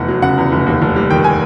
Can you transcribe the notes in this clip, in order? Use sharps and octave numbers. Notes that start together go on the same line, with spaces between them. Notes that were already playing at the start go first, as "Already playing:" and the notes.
Already playing: F1 E2 F#5
F#3
C#3 F#5
E2
F1
D#2
F1
G3
D#3 G5
G#5